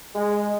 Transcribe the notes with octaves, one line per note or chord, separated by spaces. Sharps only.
G#3